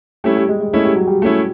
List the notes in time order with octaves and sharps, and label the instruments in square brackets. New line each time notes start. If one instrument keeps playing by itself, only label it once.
[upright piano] G3 [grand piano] A3 C#4 E4
[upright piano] G3
G#3
G#3
[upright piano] G#3 [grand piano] A3 C#4 E4
[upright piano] G3
F#3
G3
[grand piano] A3 C#4 E4